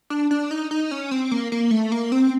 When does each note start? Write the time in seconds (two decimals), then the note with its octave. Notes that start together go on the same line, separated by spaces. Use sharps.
0.10 D4
0.31 D4
0.51 D#4
0.71 D#4
0.91 C#4
1.11 C4
1.31 A#3
1.52 A#3
1.71 A3
1.92 A#3
2.12 C4